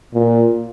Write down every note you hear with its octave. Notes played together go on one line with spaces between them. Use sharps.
A#2